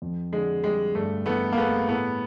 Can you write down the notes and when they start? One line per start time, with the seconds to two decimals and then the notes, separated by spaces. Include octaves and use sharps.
0.02 F2
0.32 D3 G#3
0.64 G3 G#3
0.95 G2 A3
1.26 E3 A3 B3
1.53 A#3
1.57 G#3 A3 B3
1.88 A2 A3 B3